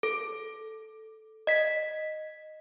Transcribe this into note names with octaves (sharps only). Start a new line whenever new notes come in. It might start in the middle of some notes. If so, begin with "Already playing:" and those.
A4
D#5 B6